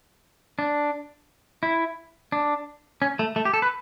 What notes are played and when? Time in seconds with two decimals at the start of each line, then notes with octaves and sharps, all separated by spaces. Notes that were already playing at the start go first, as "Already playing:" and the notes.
0.59 D4
1.63 E4
2.32 D4
3.02 C#4
3.19 A3
3.36 A3
3.45 G4
3.54 A4
3.62 B4